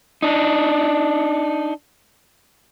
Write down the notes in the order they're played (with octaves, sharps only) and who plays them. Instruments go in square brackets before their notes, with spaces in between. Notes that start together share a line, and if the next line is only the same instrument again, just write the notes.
[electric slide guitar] D4 D#4